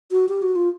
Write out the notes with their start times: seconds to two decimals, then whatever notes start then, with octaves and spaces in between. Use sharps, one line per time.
0.11 F#4
0.29 G4
0.42 F#4
0.56 F4